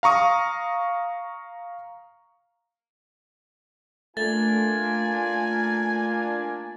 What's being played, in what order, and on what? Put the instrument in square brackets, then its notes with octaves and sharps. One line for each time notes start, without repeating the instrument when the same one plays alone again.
[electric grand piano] F5 A#5 C#6 D#6
[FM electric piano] A3 [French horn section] A#3 D4 F4 [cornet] G#5 [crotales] A6